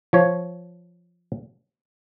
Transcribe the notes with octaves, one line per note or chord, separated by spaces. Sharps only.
F3 C#5